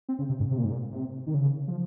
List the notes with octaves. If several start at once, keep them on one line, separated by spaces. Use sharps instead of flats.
C4
C#3
C3
G#2
C3
A#2
G#2
A#2
C3
D#3
C#3
F3